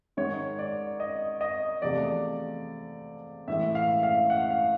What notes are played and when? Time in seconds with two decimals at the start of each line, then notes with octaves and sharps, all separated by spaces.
0.17 G#2 D#3 G#3 C#5
0.59 D5
1.00 D#5
1.41 D#5
1.82 E2 C3 F3 A3 D5
3.47 A2 E3 G#3 E5
3.75 F5
4.03 F5
4.30 F#5
4.51 F5